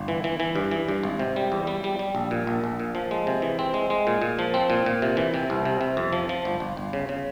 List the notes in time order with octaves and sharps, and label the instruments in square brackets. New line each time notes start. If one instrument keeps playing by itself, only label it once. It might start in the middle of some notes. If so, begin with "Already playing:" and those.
Already playing: [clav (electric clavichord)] G1
E3
E3
E3
G2
E3
G2
G#1
C3
G3
E2
G3
G3
G3
A#1
A#2
A#1
A#1
A#2
F3
G#3
C3
E3
C4
G#3
G#3
A#2
A#2
F3
C4
A#2
A#2
C3
E3
C3
C2
C3
C3
F2
F3
F3
G1
G1
G1
C#3
C#3